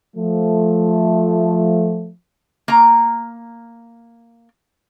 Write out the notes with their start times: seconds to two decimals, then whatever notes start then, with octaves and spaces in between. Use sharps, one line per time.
0.17 F3 A3
2.68 A#3 A#5